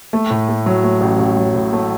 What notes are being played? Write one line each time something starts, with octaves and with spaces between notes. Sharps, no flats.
A3
A2
A3
F#3
A3
A1
A1
F#3
A2
A3